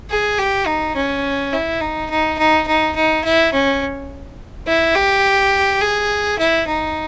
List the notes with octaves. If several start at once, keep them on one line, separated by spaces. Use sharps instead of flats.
G#4
G4
D#4
C#4
E4
D#4
D#4
D#4
D#4
D#4
E4
C#4
E4
G4
G#4
E4
D#4